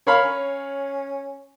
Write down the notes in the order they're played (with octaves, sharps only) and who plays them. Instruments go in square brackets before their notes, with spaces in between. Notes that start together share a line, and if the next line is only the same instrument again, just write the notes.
[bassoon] A#4 [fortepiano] C#5 F5 B5
[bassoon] C#4